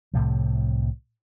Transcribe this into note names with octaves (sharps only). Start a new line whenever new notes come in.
C2 A2 C3 F3